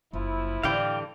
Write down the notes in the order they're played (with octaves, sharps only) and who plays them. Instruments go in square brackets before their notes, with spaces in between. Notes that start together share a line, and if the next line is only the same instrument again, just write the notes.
[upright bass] F#1 [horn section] F3 E4
[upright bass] A2 [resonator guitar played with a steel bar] D3 E3 G3 [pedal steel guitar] F5 G5